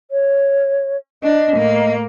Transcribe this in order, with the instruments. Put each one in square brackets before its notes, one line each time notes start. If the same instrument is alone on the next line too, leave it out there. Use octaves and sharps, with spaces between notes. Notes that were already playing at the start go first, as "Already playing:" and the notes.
[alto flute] C#5
[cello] D4 [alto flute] D#5
[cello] A2 A#3